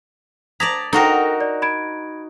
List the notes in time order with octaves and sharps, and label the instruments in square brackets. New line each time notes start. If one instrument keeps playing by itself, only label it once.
[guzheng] D5 A5 A#5 [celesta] D#6 G#6 B6
[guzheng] D#4 F#4 A#4 [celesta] A4 F#5 G5
[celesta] D5
B5 G#6 D7